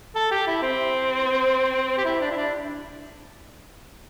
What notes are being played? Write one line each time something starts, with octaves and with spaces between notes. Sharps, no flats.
A4
G4
E4
C4
G4
E4
D4
E4
D4